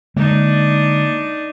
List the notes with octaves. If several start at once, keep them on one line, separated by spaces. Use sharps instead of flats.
D3 G#3 A#3 D4 D#4